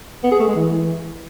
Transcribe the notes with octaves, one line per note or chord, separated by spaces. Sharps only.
B3
G#4
A3
G#3
E3